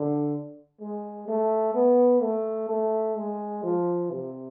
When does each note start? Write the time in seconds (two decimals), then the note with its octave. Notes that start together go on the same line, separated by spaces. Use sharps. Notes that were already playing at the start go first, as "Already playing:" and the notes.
Already playing: D3
0.81 G#3
1.28 A3
1.74 B3
2.22 A3
2.69 A3
3.17 G#3
3.64 F3
4.11 C3